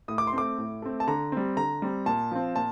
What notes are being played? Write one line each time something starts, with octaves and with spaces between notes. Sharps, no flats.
A2 D#6
D6
C6
A3 C4 D6
A2
A3 C4
A5
D3 A#5
G3 C4
D3 A#5
G3 C4
A#2 A5
F3 C4
A#2 A5